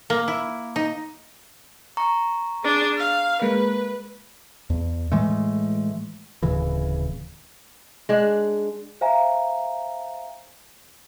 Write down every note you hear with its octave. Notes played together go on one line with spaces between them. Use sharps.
A#3
E4
D#4
A#5 C#6
D4 G#4
F5
G#3 A#3 B4
E2
A2 E3 G#3 A3
D1 C#3 E3
G#3 D4
C5 E5 F5 G#5 A#5